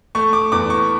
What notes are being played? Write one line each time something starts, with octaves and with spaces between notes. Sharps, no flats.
A3 C#6
D6
E2 D6
C#6